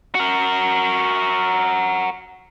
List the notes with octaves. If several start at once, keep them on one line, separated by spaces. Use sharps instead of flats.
F#4 A#4